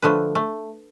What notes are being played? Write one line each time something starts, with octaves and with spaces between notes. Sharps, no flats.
D3 F3 A3 B4
A3